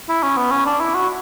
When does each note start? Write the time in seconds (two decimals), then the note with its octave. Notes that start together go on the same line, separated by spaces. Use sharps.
0.09 E4
0.23 C#4
0.37 B3
0.51 C#4
0.66 D4
0.81 E4
0.95 F#4